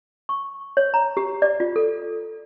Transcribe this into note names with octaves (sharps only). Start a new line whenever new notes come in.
C#6
C#5
A#5
G4
D5
F4
A4